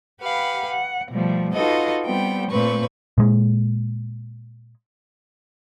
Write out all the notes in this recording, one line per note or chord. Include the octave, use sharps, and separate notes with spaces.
G4 B4 F5 F#5 B5
F#5
B2 F3 G3 A3
D#4 F4 F#4 A4 B4 D#5
G3 B3 C4 G5
A#2 A3 C4 B4 C#6
A#2 G#3